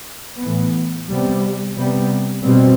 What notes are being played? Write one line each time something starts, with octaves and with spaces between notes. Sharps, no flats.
A2 E3 B3
C3 G3 B3
C3 G3 B3
B2 G3 C4